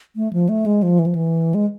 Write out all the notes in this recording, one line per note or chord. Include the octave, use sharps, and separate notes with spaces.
A3
F3
A3
G#3
F3
E3
F3
E3
G#3